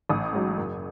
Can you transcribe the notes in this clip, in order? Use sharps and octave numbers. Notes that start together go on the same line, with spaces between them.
A1 D#6
G#2 F#3
F#1